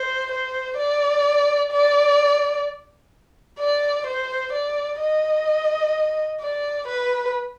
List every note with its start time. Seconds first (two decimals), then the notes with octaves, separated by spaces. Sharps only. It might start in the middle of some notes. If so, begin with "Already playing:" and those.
Already playing: C5
0.32 C5
0.78 D5
1.72 D5
3.59 D5
4.06 C5
4.53 D5
5.00 D#5
6.40 D5
6.87 B4